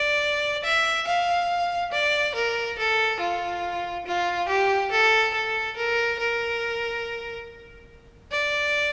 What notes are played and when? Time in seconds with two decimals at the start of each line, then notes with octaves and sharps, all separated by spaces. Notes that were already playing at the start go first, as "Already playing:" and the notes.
Already playing: D5
0.64 E5
1.07 F5
1.91 D5
2.34 A#4
2.78 A4
3.20 F4
4.06 F4
4.48 G4
4.90 A4
5.33 A4
5.76 A#4
6.19 A#4
8.31 D5